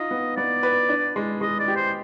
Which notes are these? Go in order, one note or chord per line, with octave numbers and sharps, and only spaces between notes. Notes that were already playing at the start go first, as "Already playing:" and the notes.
Already playing: D#4 F4 D#5
B3
B3 D5
B4
D4
G#3
G#3 D#5
D5
G4
C5